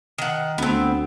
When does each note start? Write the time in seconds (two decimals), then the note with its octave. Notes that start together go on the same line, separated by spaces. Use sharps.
0.18 D#3 F#5
0.58 D2 B3 C4